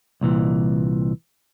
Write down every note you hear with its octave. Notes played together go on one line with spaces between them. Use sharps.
C2 A#2 E3